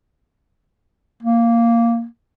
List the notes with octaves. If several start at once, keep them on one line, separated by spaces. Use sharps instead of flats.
A#3